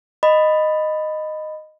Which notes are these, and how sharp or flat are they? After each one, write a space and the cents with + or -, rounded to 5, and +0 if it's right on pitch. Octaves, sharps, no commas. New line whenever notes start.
D#5 -10 B5 +10